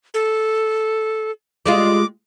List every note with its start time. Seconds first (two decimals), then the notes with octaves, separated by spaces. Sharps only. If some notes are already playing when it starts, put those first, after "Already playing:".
0.14 A4
1.66 G3 G#3 F4 D6